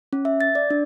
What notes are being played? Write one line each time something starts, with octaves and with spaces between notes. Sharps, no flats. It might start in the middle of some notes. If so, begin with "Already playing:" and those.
C#4
E5
A6
D5
D4